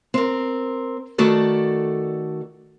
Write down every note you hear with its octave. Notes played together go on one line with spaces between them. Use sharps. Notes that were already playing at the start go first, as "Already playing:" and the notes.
C4 A#4
D#3 A3 F#4 A4 D5